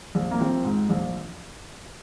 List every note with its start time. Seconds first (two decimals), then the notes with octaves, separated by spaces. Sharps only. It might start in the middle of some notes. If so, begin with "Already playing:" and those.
0.15 A#1
0.31 A#3
0.40 F3 C4
0.65 G#2
0.90 A#1